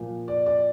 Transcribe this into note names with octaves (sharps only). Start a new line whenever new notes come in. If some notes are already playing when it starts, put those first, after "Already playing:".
Already playing: A#2 F3
D5
D5